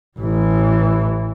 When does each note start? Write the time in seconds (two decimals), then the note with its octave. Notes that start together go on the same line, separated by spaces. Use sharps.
0.20 A1 E3